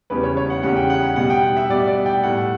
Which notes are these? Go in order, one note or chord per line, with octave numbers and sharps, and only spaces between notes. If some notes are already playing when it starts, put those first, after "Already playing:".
E2 C#3 G3 B4
C#5
C#5
F#5
E2 C#3 G3 F#5
G5
F#5
B2 G3 F#5
G5
F#5
E5
B2 G3 D5
D5
G5
A2 G3 F#5